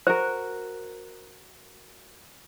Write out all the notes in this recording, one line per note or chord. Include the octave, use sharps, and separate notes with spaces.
F#4 A#4 C5